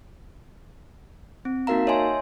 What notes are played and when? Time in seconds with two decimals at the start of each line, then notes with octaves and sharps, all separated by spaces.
1.45 C4
1.67 A#3 D#4 F#4 A#4 F5 A#5
1.87 C#5 D#5 E5 G#5 C6